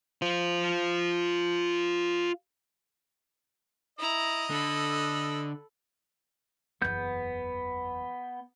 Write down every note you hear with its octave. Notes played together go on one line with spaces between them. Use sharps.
F4 C5
E4 D#5 A#5
D3 A4 B5
F#1 E2 B3 G6